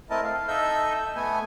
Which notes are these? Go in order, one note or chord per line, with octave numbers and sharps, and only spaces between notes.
A3 C4 E4 A#4 D#5 A5
F5
D#4 A4 D#5 E5 E6 G6
A3 B3 G#5